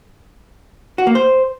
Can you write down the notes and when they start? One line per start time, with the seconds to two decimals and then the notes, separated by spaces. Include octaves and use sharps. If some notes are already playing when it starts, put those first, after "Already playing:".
0.98 F#4
1.07 A#3
1.15 C5